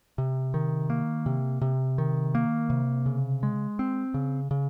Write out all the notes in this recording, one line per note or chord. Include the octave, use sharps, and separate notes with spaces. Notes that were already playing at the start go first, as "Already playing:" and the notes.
C3
D#3
A#3
C3
C3
D#3
A#3
C3
C#3
G#3
C4
C#3
C#3